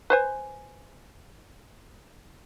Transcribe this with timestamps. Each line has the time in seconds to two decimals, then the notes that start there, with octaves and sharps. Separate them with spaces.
0.10 B4 C5 G#5